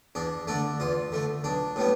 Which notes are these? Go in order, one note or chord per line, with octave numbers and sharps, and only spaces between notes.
E2 D4
D3 A3 D4
E2 F4
D3 A3
B1 D4
A2 G3 B3